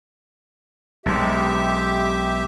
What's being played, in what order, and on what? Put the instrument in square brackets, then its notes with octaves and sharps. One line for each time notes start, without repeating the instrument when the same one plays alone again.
[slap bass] B1 G#3 [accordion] G4 E5